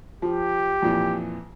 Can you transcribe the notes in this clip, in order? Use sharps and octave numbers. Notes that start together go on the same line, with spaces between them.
F3 G4
F2 A#2 E3